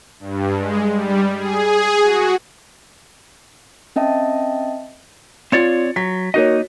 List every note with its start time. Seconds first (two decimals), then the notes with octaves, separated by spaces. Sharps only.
0.20 G2
0.58 G#3
0.91 G3
1.36 G#4
2.00 F#4
3.96 C4 C#4 D#5 E5 A5
5.52 C4 F4 C#5 D5 A6 C#7
5.96 F#3 B6
6.34 A#3 D#4 F#4 A#4 C#5 D#5